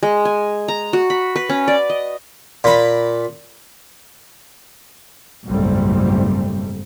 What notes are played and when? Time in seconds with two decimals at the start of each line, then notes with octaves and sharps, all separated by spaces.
0.03 G#3
0.25 G#5
0.68 A#5
0.93 F#4
1.10 B5
1.36 B4
1.49 C#4
1.68 D5
1.90 D#5
2.64 A#2 B5
5.46 F#1 B1 G#2 G3 A3 C4